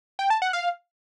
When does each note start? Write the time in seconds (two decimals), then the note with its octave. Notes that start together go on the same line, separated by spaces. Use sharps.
0.19 G5
0.30 A5
0.42 F#5
0.53 F5